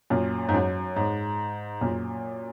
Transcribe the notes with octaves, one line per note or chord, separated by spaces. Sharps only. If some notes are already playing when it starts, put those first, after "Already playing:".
F#2 A#2
G#2
F#2
G#2
F#2 A#2